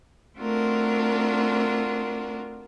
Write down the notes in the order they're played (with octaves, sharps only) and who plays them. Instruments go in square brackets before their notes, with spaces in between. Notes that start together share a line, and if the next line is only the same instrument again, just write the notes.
[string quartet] A3 C4 D4 F4 F#4 A#4